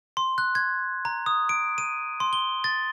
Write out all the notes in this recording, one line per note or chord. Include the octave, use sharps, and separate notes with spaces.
C6
F#6
G#6
A#5
D#6
D7
D#7
C6
G7
A6